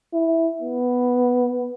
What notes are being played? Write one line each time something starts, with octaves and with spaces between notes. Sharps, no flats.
E4
B3